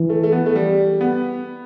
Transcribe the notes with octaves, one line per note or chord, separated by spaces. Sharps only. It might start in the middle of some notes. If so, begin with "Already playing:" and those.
Already playing: E3
A3
A3
B3
A3
G3
B3